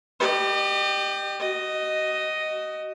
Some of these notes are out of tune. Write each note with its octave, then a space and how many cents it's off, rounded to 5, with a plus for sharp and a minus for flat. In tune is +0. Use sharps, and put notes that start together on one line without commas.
G4 +0 D#5 -40
F#4 +30 D#5 +0